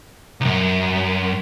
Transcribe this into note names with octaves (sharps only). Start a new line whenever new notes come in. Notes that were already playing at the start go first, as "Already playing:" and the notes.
C2 F#2